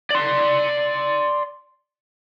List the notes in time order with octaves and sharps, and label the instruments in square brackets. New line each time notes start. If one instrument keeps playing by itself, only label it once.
[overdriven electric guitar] D5 C6